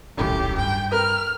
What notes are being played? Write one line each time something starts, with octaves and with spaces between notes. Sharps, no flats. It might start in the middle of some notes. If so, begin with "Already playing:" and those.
D#1 C2 F#2 A2 D#3 G4
G2 G5
A#4 B4 F6